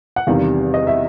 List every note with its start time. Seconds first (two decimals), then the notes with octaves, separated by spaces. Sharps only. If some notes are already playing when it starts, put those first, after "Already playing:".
0.16 F#5
0.27 E2 C3 D#3 G3 F5
0.74 D#5
0.87 E5